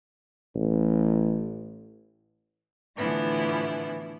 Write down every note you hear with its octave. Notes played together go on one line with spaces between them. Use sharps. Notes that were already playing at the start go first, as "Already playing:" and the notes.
A1
A2 D3 E3 F3 B3 E4